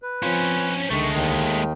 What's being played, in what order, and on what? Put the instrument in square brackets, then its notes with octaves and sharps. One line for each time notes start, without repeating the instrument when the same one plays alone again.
[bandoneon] B4
[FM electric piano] F3 C4 F4 [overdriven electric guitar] C#4 C5
[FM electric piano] C#2 D3 C#7 [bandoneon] D#3 C#6 [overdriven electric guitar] G#3 A3
[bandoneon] D#2 D#3